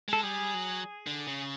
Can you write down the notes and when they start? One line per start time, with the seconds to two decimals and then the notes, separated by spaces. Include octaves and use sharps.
0.09 G#3 A4
0.23 G3 G#4
0.54 F#3
1.07 D3
1.27 C#3